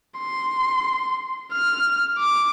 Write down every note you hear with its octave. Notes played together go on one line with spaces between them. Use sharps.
C6
F6
D6